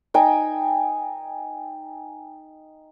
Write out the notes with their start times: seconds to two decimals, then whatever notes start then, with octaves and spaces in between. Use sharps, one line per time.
0.14 D#4 G5 G#5